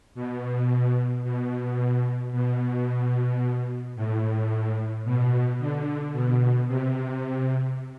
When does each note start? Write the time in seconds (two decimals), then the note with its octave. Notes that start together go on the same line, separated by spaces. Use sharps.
0.15 B2
1.24 B2
2.32 B2
3.96 A2
5.05 B2
5.59 D3
6.13 B2
6.67 C3